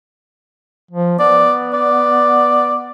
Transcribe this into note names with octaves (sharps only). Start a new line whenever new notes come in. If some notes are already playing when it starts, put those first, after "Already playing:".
F3
B3 D5
D5